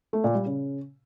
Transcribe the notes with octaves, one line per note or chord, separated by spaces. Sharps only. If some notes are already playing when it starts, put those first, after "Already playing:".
A3
A#2
G3
C#3